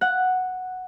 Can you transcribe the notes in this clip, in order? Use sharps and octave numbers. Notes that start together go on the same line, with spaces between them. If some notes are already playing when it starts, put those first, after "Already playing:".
F#5